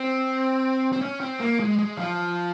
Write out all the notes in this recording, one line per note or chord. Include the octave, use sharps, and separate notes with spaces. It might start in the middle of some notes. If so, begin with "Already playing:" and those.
Already playing: C4
C4
C#4
C4
A#3
G#3
G#3
F3